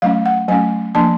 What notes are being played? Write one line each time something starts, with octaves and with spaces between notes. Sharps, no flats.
F#3 A3 C#4 F5
F#5
F#3 A3 C#4 G#5
F3 A#3 D4 A5